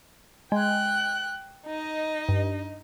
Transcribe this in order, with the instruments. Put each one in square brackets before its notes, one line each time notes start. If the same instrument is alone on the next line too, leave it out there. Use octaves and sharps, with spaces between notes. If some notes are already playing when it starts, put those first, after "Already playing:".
[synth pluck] G#3 [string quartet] G5 F#6
[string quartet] D#4 D#5
[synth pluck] G2